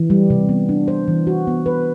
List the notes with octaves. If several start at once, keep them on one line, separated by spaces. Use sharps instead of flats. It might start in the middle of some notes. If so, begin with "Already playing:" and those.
Already playing: E3
G3
C3
B3
D4
C5
E3
F#4
B3
B4